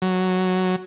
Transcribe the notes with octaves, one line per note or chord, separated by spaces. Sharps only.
F#3